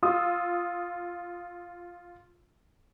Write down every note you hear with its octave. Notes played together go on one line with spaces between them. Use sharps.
F4 D#6 E6